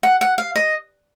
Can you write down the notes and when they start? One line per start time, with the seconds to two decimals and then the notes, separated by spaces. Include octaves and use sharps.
0.03 F#5
0.21 F#5
0.38 F5
0.56 D#5